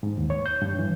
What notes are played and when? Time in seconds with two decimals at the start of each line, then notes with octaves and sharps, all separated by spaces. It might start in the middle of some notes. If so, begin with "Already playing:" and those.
0.03 G#2
0.18 D#2
0.30 C#5
0.46 G6
0.62 G2
0.79 E3